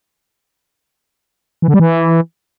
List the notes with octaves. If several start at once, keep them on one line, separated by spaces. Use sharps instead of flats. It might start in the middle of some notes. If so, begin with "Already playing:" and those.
E3
D3
G3
E3